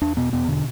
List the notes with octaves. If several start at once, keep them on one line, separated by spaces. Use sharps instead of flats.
E2 D4
B2 B3
E2 B3
B2 D3